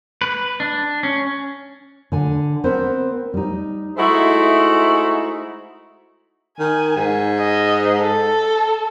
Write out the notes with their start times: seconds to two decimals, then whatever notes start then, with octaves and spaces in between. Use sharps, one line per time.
0.22 B4
0.60 D4
1.03 C#4
2.12 D3 G#5
2.64 B3 C4 A#4 C5
3.34 G3 D#4
3.97 G#3 A3 D#4 E4 F#4 C5
6.59 D#3 G#5
6.96 G#2
7.38 D#5
8.00 A4